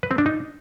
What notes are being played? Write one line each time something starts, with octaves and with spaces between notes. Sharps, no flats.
B4
C4
D4
D#4